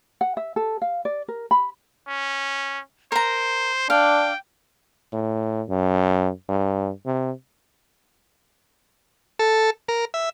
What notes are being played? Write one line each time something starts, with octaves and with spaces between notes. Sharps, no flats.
F#5
E5
A4
F5
D5
A#4
B5
C#4
A#4 C5 A#5
D4 D5 F5 G5
A2
F#2
G2
C3
A4
A#4
E5